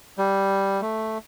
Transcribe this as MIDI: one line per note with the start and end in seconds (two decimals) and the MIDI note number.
0.18 0.81 55
0.81 1.18 57